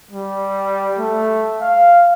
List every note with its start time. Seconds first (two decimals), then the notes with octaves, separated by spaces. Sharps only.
0.11 G3
0.99 A3
1.62 F5